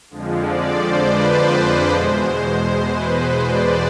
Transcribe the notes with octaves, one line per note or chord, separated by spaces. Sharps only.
F2 D3 F3 G#3
D5
C5
B4
C5
D5
E2 B2 G#3 C5
B4
C5
D5